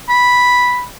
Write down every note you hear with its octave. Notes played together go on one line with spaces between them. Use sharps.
B5